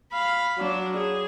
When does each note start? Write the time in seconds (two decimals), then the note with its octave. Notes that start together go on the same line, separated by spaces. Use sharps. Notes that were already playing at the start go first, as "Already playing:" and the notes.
0.12 F5 B5
0.58 F#3 D4
0.97 G#4